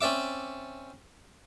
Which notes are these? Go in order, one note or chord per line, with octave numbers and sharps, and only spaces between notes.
C4 C#4 D5 E5 D6